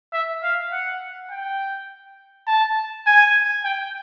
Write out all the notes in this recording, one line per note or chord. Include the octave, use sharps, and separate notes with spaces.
E5
F5
F#5
G5
A5
G#5
G5